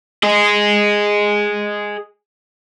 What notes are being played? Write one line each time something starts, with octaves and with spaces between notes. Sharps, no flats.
G#4 D#5